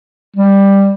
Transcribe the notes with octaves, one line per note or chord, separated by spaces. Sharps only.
G3